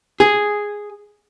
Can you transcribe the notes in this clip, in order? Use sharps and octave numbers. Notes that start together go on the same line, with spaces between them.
G#4